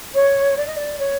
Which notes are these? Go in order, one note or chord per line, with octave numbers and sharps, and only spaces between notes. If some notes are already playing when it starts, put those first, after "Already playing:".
C#5
D5
D#5
D5
C#5